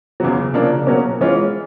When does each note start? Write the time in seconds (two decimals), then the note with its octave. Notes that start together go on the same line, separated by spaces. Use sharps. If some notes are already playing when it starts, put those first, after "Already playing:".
0.20 E2 C#3 F#3
0.54 C#3 F3 A#3 D4
0.87 B2 F#3 A#3 C#4
1.21 E3 G#3 C#4 F4